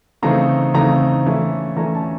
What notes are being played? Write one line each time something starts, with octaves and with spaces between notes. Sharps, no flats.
C#3 E3 A3 C4 D#4 A#5
C#3 E3 A3 C4 D#4 A#5
E3 A3 C#4 E4
E3 A3 C#4 E4 A#5
A5